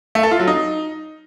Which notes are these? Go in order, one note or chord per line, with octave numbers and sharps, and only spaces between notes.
A3
A4
F4
F#3
D#4